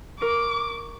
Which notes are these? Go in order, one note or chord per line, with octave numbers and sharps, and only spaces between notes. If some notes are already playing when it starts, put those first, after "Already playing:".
A#4 C#6 D6 D7